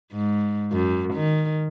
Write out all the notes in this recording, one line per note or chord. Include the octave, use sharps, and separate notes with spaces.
G#2
F#2
D#3